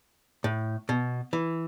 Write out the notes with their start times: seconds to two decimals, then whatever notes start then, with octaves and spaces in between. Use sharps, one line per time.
0.44 A2
0.89 B2
1.33 E3